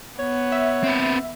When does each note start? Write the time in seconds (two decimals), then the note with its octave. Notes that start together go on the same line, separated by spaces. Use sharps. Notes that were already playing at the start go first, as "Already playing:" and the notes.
0.19 B3 C#5
0.52 E5
0.84 C4 B4